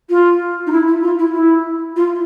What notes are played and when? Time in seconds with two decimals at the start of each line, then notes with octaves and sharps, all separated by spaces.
0.09 F4
0.66 D#4
0.71 E4
0.87 E4
1.02 F4
1.18 E4
1.34 E4
1.96 F4